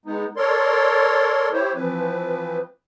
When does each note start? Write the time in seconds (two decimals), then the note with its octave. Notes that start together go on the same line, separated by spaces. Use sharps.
0.05 G#3 B3 D#4
0.37 A4 A#4 C#5 D5 C6
1.53 E4 G4 C5 C#5
1.75 E3 F3 C4 B4